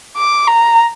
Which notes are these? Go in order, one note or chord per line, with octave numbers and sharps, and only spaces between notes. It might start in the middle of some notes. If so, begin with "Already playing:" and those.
D6
A#5